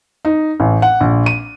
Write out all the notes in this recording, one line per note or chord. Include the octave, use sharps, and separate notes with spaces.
D#4
A1
F#5
A#1
D#7